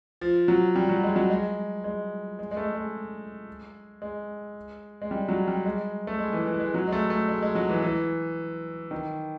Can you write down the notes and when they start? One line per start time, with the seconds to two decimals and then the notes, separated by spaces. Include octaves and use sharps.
0.21 F3
0.48 F#3
0.75 G3
0.89 F#3
1.03 G#3
1.16 F#3
1.30 G#3
1.84 G#3
2.39 G#3
2.51 G#3
2.57 A3
2.75 G#3
4.02 G#3
5.02 G#3
5.11 G3
5.29 F#3
5.48 G3
5.65 G#3
6.07 A3
6.19 G#3
6.33 E3
6.47 E3
6.60 G#3
6.74 F#3
6.88 G#3
6.92 A3
7.10 A3
7.28 G#3
7.42 G#3
7.55 F#3
7.69 E3
7.83 E3
8.91 D#3